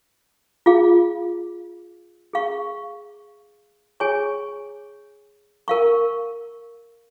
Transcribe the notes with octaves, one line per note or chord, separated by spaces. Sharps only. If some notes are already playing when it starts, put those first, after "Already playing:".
F4 G#4 F5
G#4 F5 C#6
G#4 C#5 G#5 C#6
A#4 F5 C#6